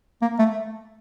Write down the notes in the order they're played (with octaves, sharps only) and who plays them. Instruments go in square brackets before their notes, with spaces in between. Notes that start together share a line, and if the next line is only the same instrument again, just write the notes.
[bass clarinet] A#3
A3